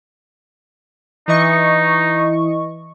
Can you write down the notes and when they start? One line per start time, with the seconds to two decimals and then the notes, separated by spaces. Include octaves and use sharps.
1.28 E3 D#4 D#5 C#6